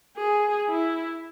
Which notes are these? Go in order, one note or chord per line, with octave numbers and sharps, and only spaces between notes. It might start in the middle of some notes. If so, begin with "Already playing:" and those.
G#4
E4